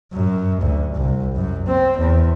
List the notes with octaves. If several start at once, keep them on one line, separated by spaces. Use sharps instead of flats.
F#2
D2
C2
F#2
C4
E2